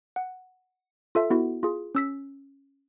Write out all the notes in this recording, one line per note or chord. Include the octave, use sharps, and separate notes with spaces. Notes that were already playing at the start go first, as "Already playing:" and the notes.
F#5
F4 A4 E5
B3 E4 F#4
F4 G#4
C#4 E6 B6